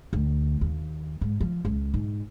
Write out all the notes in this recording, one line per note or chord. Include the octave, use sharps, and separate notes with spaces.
D2
D#2
G#2
F3
C#2
G#2